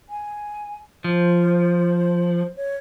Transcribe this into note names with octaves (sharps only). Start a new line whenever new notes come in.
G#5
F3 C5
C#5